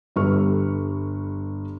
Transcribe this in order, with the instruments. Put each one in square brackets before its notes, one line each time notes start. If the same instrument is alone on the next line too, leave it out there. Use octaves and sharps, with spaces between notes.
[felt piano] G1 G3 A4 B4 C#6 F6